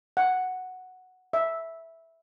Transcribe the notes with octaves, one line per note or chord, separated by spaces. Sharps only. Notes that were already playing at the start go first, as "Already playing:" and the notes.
F#5
E5